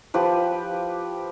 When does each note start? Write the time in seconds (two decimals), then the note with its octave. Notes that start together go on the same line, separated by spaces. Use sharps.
0.14 F3 G4 B4